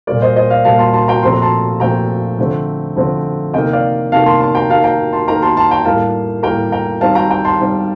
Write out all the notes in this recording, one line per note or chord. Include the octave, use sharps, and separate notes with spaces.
A#2 G3 A#3 D5
C5 D#5
C5 D#5
D5 F5
A#2 G3 A#3 F5 A5
A5 C6
A5 C6
G5 A#5
A#2 F3 A3 C4 C6
A#5
A5 C6
A#2 F3 A3 C4 G5 A#5
D3 F3 A3 C4
D3 F3 A3 C4
C3 D#3 A#3 D#5 G5
D5 F5
C3 D#3 A#3 F5 A5
A5 C6
A5 C6
G5 A#5
D#3 A#3 F5 A5
G5 A#5
A5 C6
D#3 A#3 G5 A#5
A5 C6
A5 C6
G5 A#5
A2 G3 A#3 F5 A5
A2 G3 A#3 G5 A#5
G5 A#5
D#3 G3 C4 F5 A5
G5 A#5
G5 A#5
A5 C6
D#3 G3 C4